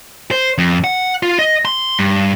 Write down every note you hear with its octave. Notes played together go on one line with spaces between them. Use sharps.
C5
F2
F#5
F4
D#5
C6
G2